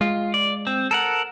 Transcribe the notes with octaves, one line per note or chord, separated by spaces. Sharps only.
G#3 F4
D5
C4
A4 A#4 F#5